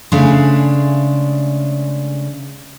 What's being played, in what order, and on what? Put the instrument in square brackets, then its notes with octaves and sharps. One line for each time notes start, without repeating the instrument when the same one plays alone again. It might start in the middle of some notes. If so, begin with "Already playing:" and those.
[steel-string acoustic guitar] C#3 G#3 A3 D4